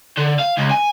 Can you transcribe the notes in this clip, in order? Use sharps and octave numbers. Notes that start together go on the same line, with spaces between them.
D3
F5
C#2
G#5